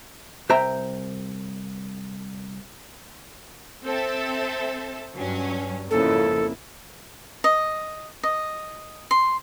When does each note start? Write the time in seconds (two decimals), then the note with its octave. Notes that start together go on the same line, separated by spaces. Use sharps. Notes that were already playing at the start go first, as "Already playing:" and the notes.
0.49 C2 C5 E5 G5 A#5
3.84 C4 A4 E5
5.15 G2 F#3 C#4
5.91 F2 G#2 C#3 A#3 E4 A4
7.44 D#5
8.23 D#5
9.11 C6